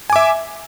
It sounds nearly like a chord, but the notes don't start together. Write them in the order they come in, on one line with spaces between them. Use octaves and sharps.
G#5 D6 E5